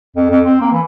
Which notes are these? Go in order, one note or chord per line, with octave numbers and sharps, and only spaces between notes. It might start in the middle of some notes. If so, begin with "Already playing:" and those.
F2
F2
C4
A#3
E3